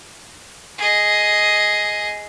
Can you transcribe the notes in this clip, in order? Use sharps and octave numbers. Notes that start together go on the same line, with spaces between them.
G#4 D#5